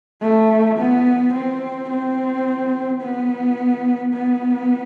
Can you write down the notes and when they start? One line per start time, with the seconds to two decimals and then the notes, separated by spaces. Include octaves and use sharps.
0.21 A3
0.78 B3
1.33 C4
1.90 C4
3.01 B3
4.13 B3